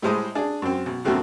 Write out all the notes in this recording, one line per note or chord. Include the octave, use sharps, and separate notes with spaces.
A2 G3 G#3 C5 D#6
D4 G#4
F#2 C4
B1
F#2 B2 D#3 A3 C4 F#4